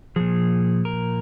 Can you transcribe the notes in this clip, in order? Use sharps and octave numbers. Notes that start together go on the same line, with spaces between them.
A#2 F3 G#4
A#4